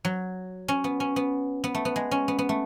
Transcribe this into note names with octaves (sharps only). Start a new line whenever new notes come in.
F#3
C#4
B3
C#4
B3
B3
A3
B3
G#3
C#4
B3
B3
A3